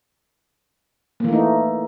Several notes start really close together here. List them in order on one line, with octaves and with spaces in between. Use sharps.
A#3 E3 A3 D#4